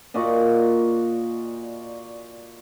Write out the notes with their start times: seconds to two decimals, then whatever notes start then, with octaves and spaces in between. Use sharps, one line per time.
0.14 A#2 F#4 D5 D#5